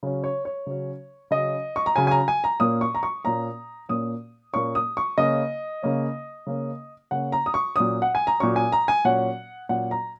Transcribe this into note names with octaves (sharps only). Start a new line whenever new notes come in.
C#3 F#3 C#4
C#5
C#5
C#3 F#3 C#4
C#3 F#3 C#4 D#5
C#6
A#5
C#3 F#3 C#4 G#5
G#5
A#5
G#5
A#5
A#2 A#3 C#4 D#6
C#6
A#5
C#6
A#2 A#3 C#4 A#5
A#2 A#3 C#4 D#6
A#2 A#3 C#4 C#6
D#6
C#6
C#3 A#3 C#4 D#5
C#3 A#3 C#4
C#3 A#3 C#4
C#3 A#3 C#4 F#5
A#5
D#6
C#6
A#2 F#3 C#4 D#6
F#5
G#5
A#5
A#2 F#3 C#4 C#6
G#5
A#5
G#5
A#2 F#3 C#4 F#5
A#2 F#3 C#4 F#5
A#5